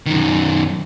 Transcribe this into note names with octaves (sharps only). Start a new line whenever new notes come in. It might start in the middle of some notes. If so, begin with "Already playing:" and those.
F#2 D#3